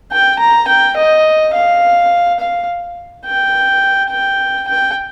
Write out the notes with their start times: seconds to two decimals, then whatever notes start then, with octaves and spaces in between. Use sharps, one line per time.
0.12 G5
0.39 A#5
0.68 G5
0.97 D#5
1.54 F5
2.40 F5
3.26 G5
4.10 G5
4.68 G5